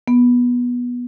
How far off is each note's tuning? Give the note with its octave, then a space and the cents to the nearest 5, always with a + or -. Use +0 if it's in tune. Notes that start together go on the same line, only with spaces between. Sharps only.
B3 -15